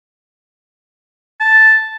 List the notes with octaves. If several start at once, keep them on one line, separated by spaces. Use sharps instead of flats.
A5